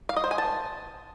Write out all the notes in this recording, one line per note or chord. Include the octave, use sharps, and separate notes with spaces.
F5
D#5
C5
G#5
A5